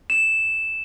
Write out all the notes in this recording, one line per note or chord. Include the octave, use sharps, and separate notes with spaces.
E7